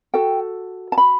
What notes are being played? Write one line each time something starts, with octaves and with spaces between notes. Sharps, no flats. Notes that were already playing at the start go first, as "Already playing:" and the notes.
F#4 A4 G5
A5
B5